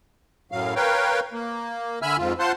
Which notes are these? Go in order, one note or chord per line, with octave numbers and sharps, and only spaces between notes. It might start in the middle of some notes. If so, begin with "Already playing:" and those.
F#2 A2 F#3 F5
A#4 B4 C#5 F5 G5
A#3
D3 E5 G#5 B5 E6 F6
F2 G#2 F4
F4 C5 F#5 A5 C6